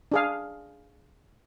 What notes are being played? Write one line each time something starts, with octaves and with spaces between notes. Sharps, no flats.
D4 G#4 F5